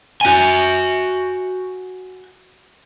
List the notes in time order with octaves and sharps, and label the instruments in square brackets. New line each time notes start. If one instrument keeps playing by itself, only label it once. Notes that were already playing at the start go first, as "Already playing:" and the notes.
[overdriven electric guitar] F#4 G#5